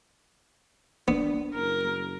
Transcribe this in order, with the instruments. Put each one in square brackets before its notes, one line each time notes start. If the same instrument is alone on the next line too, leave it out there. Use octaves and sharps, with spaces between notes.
[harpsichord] B3 [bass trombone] D4
[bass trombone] F#1 [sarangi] A#4